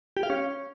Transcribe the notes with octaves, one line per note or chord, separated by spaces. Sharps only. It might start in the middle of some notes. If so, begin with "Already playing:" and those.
G4
F5
C#4